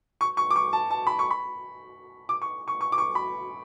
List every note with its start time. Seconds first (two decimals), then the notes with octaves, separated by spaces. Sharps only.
0.21 C#6
0.37 C#6
0.51 D6
0.56 C#6
0.73 A5
0.90 A5
1.07 B5
1.19 C#6
1.31 B5
2.29 D6
2.42 C#6
2.68 C#6
2.81 C#6
2.92 D6
2.98 C#6
3.15 B5